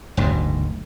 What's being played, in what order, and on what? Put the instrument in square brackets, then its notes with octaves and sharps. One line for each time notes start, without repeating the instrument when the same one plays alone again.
[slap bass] F#1 D2 G#2 B2